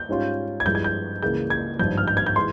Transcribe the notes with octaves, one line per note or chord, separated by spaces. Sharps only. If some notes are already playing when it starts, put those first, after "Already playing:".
Already playing: G6
G#2 G3 C#4 F4
G#6
G2 F3 G#3 E4 G6
G#6
G6
C#2 C#3 E3 A#3 G6
G#6
G#1 G2 F3 G6
F6
G6
G#6
G6
E3 G#3 C6